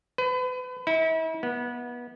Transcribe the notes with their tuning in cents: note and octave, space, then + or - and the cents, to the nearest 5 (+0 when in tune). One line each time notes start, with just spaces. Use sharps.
B4 +35
E4 -40
B3 -25